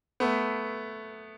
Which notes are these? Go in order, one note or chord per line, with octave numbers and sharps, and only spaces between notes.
A3 B3